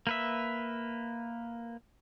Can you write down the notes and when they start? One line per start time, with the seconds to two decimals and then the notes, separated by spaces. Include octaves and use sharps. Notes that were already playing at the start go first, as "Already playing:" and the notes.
0.07 A#3 B4 E5